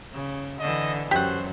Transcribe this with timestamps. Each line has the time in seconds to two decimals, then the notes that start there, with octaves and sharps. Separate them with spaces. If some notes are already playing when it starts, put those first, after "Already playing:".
0.13 C#3
0.60 D3 E3 D#5
1.11 F#2 G4 C5 F#5